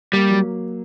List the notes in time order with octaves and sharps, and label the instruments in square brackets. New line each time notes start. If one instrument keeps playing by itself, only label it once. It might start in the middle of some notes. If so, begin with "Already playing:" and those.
[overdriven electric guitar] G3 [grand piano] A#3
[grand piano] F#3